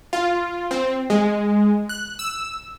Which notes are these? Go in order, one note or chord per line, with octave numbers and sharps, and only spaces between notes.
F4
C4
G#3
F#6
E6